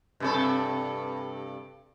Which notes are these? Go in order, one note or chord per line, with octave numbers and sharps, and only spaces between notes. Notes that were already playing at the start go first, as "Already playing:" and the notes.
G2 C3 A4